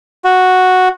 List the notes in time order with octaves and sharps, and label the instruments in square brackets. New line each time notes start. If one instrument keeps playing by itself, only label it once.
[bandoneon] F#4